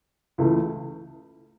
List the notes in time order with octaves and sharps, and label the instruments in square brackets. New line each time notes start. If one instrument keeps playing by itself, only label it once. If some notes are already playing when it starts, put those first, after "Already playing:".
[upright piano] C#2 C#3 E3 A3